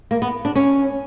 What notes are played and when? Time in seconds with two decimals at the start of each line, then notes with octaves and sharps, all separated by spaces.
0.11 A#3
0.22 B3
0.45 D4
0.55 C#4